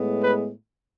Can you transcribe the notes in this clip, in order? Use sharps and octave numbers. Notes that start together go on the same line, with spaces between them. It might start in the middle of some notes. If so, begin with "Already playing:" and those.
Already playing: A2 G#3 B3
B4